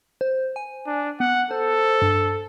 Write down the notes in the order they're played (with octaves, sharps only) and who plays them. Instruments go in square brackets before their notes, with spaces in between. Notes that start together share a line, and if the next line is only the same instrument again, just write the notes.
[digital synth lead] C5
G#5
[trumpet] D4
[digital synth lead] B3 [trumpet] F#5
[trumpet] A4 [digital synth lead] C5
[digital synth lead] G2